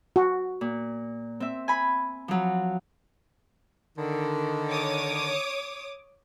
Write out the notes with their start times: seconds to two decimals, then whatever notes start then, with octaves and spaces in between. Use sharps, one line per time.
0.16 F#4
0.61 A#2
1.40 C4 E5
1.68 G#5 B5
2.28 F3 F#3
3.98 D3 D#3
4.70 C#5 D6 D#6